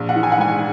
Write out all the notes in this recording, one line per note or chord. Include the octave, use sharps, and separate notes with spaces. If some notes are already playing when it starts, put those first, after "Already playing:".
Already playing: A#1
F#5
E3
G#5
F#5
G#2 G#5